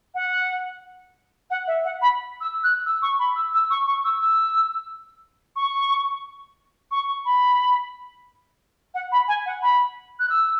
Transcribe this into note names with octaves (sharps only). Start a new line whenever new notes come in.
F#5
F#5
E5
F#5
B5
E6
F#6
E6
C#6
B5
E6
E6
C#6
C#6
E6
E6
C#6
C#6
B5
F#5
B5
G#5
F#5
B5
F#6
E6